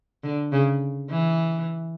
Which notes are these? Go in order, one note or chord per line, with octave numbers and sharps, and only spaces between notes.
D3
C#3
E3